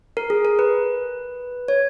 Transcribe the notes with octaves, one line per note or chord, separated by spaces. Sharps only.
A#4
G#4
A#4
B4
C#5